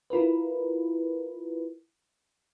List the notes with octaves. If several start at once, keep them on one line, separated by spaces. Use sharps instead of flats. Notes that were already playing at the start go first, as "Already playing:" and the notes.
E4 F4 A#4 B4